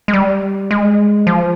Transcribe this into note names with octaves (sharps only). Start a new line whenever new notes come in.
G#3
G3
G#3
F3